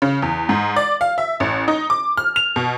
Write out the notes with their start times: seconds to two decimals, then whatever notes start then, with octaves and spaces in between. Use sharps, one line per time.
0.02 C#3
0.22 E2
0.49 G#2
0.76 D5
1.01 F5
1.18 E5
1.40 A1
1.68 D#4
1.90 D6
2.17 F6
2.36 F7
2.56 B2